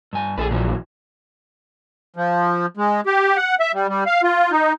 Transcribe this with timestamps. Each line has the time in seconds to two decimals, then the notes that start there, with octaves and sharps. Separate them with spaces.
0.13 G2 G#5
0.38 A#1 G#4 A4 B4
0.51 A#2 E3 F#3
2.16 F3
2.77 G#3
3.06 G4
3.37 F#5
3.60 E5
3.74 G3
3.89 G3
4.06 F5
4.23 F4
4.51 D#4